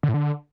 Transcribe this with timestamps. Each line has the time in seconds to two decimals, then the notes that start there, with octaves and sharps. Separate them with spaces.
0.03 D3
0.09 A2
0.14 D3